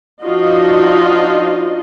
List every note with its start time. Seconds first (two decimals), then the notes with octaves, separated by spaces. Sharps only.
0.23 F3 D4 D#4 F4 F#4 D#5